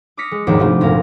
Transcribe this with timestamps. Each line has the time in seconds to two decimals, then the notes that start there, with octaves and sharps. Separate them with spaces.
0.17 D6 D#6 F6 A#6 B6 C#7
0.31 G#3
0.47 F1 A#1 D#2 G#2 D4 D6
0.59 C3 A3 F4 F#4
0.81 G1 C2 A#2 F5 A#6